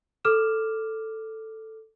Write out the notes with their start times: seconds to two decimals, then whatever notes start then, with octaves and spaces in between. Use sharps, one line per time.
0.25 A4 D6 F6 E7